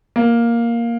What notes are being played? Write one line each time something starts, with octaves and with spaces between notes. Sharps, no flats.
A#3